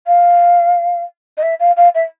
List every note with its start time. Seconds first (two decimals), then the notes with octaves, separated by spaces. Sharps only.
0.07 F5
1.37 D#5
1.43 E5
1.60 F5
1.77 F5
1.95 E5